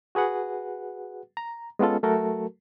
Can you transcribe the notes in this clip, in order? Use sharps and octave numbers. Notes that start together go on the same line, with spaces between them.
F#4 G#4 B4 F#5
A#5
G#3 B3 C#4 F4 A4
F#3 A3 F#4 A4 A#4